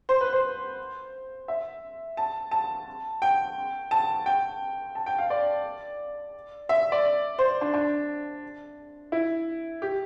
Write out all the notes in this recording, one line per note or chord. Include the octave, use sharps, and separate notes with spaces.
C5
B4
C5
E5
A5
A5
G5
A5
G5
A5
G5
F5
D5
E5
D5
C5
D4
D4
E4
G4